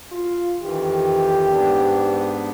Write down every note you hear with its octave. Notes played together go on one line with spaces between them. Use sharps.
F4
F2 D#3 E3 G4
G#2 B3 D4